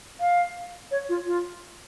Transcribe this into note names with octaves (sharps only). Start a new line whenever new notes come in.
F5
C#5
F4
F4